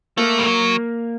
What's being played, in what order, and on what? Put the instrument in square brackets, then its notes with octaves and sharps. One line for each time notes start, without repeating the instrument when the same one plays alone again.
[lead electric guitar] A3 [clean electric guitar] A#3
[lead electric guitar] G3
F#3